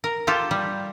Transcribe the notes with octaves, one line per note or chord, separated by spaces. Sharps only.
A#4
F4 G4 A4
G3